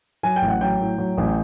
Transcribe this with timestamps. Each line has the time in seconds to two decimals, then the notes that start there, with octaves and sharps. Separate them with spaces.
0.23 F#3 G#5
0.36 G5
0.42 A1
0.48 F#5
0.61 F#3 G5
0.80 A2
0.98 F#3
1.17 A1